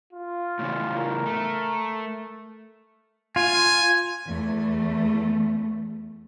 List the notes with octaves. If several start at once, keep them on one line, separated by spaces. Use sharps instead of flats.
F4
A2 C#3 E3
A#4
A3
F4 G#5
E2 A3